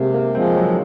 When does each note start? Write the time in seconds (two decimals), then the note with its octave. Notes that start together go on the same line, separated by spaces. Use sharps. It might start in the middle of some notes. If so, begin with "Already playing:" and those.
Already playing: C3 G#3 A#3
0.14 A#3
0.35 F3 G#3 C4
0.56 F#3